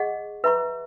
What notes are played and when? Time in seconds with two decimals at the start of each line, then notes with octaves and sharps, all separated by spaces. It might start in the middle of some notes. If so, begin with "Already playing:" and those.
Already playing: G#4 D#5 F#5 C#6
0.44 B4 E5 A#5 C#6